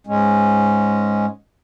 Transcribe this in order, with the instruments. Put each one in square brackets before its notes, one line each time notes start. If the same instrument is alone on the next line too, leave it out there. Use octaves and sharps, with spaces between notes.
[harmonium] G#2 G#3 C#4